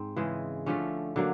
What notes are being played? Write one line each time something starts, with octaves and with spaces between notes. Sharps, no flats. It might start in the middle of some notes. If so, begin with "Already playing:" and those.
Already playing: G#2 C4
C#3 E3 G#3
D3 F3 A3 C#4
D3 F#3 A#3